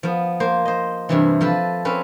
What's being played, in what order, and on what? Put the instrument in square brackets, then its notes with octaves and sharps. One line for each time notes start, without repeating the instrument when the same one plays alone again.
[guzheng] F3 B3
A#3 C5
C5 D#5
G2 C3 E3
F3 A4 B4
C4 C#4 B4